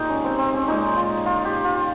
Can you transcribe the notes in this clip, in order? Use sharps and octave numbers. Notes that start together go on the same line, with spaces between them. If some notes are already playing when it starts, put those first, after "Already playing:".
Already playing: A#2 G#3 D#4 G4 A#4
C#4
C4
C4
C#4
A#2 G#3 D#4
F4
F4
G4
F4